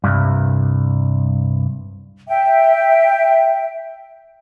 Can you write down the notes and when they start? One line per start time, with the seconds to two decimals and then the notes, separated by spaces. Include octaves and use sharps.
0.04 C2 G2
2.28 E5 G5